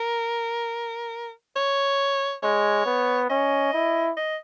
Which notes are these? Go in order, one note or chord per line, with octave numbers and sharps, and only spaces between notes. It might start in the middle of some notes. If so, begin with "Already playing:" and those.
Already playing: A#4
C#5
G#3 C#5
B3
C#4 D#5
E4
D#5